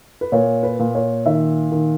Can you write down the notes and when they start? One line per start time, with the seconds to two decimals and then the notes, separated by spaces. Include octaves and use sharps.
0.21 B4
0.32 A#2 C#5
0.63 B4
0.79 A#2
0.95 C#5
1.26 D#3 E5
1.72 D#3